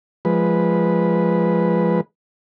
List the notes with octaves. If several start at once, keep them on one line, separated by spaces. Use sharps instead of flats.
F3 G#3 B4